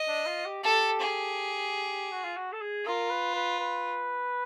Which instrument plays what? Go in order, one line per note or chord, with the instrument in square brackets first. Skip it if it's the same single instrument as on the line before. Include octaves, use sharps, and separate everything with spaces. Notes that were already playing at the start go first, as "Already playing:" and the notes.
Already playing: [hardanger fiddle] D#5
[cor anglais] D4
F4
G4
[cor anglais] G4 [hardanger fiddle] A4
[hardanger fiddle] G#4
[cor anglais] F#4
F4
F#4
A4
G#4
[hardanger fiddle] F4 [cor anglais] A#4
[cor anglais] B4
B4
B4